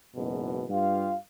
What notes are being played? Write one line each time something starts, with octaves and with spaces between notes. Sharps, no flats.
F#1 E2 G#2 B2
G2 F4 G4 F5